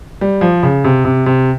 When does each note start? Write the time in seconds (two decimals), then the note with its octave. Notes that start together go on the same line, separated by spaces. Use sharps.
0.21 G3
0.41 F3
0.63 C#3
0.84 C3
1.05 C3
1.26 C3